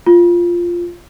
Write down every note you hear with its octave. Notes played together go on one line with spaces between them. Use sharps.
F4